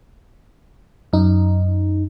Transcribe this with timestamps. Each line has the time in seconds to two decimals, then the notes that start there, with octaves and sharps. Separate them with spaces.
1.13 F#2 D#4